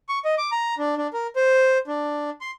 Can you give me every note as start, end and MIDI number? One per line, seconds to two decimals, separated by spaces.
0.09 0.19 85
0.25 0.35 75
0.38 0.50 86
0.52 0.74 82
0.78 0.95 62
0.97 1.07 62
1.13 1.27 70
1.36 1.78 72
1.87 2.30 62
2.41 2.51 84